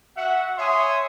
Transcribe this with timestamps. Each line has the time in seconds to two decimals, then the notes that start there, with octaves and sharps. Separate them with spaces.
0.16 F#4 E5 F#5
0.58 C#5 E5 G#5 C6 D#6